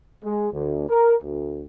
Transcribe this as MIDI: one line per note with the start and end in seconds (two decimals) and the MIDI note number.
0.24 0.47 56
0.52 0.85 38
0.89 1.14 70
1.23 1.65 38